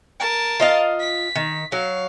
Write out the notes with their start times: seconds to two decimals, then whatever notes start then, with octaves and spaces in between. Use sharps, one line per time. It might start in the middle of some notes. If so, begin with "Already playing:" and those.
0.20 A#4 A5
0.60 F4 D#5 F5
1.00 B6
1.35 D#3
1.72 F#3 F5